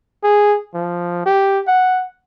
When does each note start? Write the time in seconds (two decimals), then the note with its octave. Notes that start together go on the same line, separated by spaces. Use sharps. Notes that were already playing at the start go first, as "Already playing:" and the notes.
0.24 G#4
0.74 F3
1.26 G4
1.68 F#5